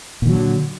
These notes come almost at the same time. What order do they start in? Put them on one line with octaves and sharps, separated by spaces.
A#2 D#3 F#3 D3